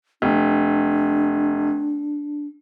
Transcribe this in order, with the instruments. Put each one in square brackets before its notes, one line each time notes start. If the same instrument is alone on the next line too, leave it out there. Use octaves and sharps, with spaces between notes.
[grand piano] F1 [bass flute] D4